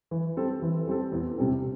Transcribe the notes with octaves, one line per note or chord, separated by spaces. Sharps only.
E3
G3 C4 A4
E3
G3 C4 A4
E2
C3 G3 C4